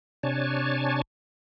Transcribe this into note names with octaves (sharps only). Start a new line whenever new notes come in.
C3 D4 C#5 G#5 A5